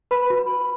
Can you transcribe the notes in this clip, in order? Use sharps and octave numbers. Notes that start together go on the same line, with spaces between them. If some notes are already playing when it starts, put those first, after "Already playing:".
B4 B5
F#4